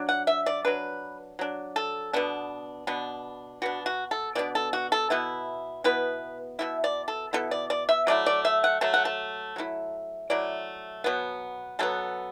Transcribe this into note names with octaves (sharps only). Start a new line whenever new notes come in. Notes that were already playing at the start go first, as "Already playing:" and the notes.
Already playing: F#3 D4
F#5
E5
D5
F#3 D4 B4
F#3 D4
A4
B2 B3 D4
B2 B3 D4
B2 B3 D4 F#4
F#4
A4
B2 B3 D4 D5
A4
F#4
A4
B2 B3 E4
B2 B3 E4 B4
B2 B3 E4 E5
D5
A4
B2 B3 E4 A4
D5
D5
E5
F#3 A3 E4 D5
D5
E5
F#5
F#3 A3 A5
F#5
A5
F#3 A3 E4
F#3 A3 E4 D5
B2 F#3 B3
B2 F#3 B3 A4